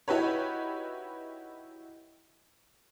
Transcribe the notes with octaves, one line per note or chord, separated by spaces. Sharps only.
D#4 E4 F#4 G4 B4 C#5